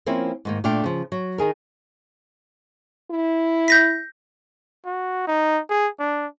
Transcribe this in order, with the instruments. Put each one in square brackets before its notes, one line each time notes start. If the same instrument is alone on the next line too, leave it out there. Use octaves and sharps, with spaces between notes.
[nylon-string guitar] F3 A#3 C4 C#4 E4
G#2 D#3 A#3
A#2 A3 D4 F5 G5
C#3 F3
F#3
D#3 D#4 G#4 A#4
[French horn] E4
[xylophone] G6 A#6 B6
[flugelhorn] F#4
D#4
G#4
D4